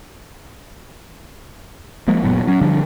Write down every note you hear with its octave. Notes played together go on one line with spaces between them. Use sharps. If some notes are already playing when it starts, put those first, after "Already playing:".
F3 G#3 A#3
F#1 A#2 F#3 B3
F#3 C#4
D3 F3 G3 D4